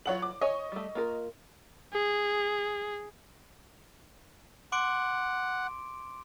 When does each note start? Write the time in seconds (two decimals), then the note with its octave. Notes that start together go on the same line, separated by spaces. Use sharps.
0.06 E3 F#3 F4 C#5 F#5 F#7
0.22 D6
0.41 C#5 D#5 G#5 C#6
0.72 G3 A3
0.95 A#3 F4 A#4
1.93 G#4
4.72 F#5 C6 D6 D7